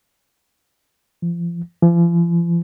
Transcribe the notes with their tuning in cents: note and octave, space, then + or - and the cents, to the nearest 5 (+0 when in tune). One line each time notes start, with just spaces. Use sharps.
F3 -35
F3 -45